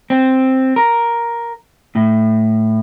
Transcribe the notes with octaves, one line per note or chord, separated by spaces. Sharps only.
C4
A#4
A2